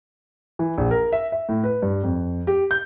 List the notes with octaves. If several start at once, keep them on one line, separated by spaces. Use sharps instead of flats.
E3
A#1
A#4
E5
E5
A2
B4
G2
F2
G4
G6